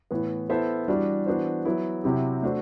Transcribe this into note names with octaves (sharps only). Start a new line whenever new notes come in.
A2 E3 B3
B3 E4 A4 C5 E5
E3 G3 D4 F#4
E3 B3 D4 F#4 C5
F#3 B3 E4
C3 F#3 C4 E4 G4
A3 D4 F#4 C5